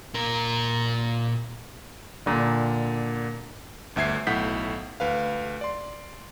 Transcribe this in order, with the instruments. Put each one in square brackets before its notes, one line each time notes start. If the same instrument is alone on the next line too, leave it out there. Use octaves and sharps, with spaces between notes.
[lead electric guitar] A#2 A#4
[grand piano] A#2 D3
[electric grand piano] G1 D2 E5 G#6 C7
B1 A2 F#5 G6 B6
D2 B4 F5
D5 C6